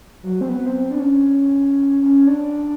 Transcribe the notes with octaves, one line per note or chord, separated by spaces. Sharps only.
F#3
C4
B3
C4
D4
C#4
C#4
D4